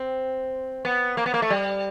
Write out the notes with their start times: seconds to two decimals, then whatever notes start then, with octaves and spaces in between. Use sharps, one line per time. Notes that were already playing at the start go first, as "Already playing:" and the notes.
Already playing: C4
0.85 B3
1.17 A#3
1.26 B3
1.34 A#3
1.42 A3
1.50 G3